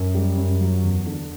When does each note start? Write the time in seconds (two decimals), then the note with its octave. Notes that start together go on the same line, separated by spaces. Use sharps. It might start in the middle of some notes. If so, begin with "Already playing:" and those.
Already playing: F#2
0.15 G3
0.37 F#2
0.61 F#3
0.84 E2
1.06 D3